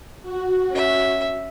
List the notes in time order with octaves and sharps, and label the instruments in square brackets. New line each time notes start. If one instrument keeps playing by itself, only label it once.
[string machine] F#4
[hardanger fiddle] C#4 E5